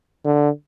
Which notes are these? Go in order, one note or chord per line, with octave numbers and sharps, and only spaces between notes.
D3